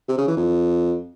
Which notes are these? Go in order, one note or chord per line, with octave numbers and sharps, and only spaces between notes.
C3
C#3
E3
F2